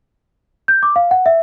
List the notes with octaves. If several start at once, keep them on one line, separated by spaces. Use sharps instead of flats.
G6
D6
F5
F#5
E5